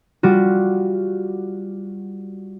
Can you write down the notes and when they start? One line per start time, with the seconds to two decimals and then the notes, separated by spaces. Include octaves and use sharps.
0.23 G3 F4 F#4